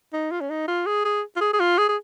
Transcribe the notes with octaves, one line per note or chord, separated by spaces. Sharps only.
D#4
F4
C#4
D#4
F4
G#4
G#4
F4
G#4
G#4
F4
G#4
G#4